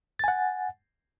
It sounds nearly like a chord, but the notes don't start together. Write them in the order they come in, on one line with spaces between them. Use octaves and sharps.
A6 G#5 F#5